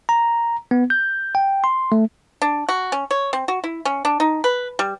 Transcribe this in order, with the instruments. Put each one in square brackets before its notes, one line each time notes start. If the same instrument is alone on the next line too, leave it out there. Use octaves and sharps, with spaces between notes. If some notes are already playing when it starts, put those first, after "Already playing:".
[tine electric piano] A#5
B3
G6
G5
C6
A3
[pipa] D4
F#4
C#4
C#5
C4
F#4
E4
C#4
D4
D#4
B4
G3